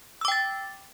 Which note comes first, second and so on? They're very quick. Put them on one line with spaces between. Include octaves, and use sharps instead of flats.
E6 D6 G5 A6